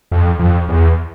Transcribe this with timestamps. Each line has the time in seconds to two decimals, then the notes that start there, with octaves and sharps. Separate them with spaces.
0.11 F2
0.39 F2
0.69 E2